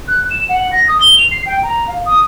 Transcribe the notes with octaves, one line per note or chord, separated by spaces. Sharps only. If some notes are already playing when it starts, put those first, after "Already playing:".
F#6
E7
F#5
A#6
D#6
G7
F7
C7
G5
A#5
F5
D#6